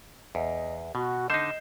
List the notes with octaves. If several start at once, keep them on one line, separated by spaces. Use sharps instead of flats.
E2 D#5
B2 F#4
D3 D#4 D#5 G6 C7 E7